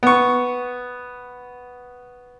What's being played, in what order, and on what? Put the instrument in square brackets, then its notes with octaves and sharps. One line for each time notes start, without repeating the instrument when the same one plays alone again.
[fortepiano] B3 C#6